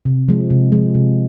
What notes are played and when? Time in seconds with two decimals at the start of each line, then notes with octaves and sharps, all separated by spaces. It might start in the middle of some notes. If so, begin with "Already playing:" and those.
0.05 C3
0.28 F3 G#3
0.50 C3
0.72 F3 G#3
0.95 C3